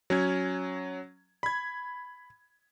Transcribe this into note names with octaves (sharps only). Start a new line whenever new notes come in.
F#3 C#4 G#6
B5 G#6